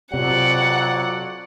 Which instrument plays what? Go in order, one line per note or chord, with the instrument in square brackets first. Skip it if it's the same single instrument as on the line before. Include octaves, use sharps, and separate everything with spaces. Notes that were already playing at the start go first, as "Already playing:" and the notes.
[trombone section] F2 F#3 [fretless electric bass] C3 [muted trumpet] D5 [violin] F#5